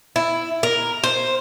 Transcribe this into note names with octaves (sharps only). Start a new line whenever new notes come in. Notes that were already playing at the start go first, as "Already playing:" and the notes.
E4
A#4
C5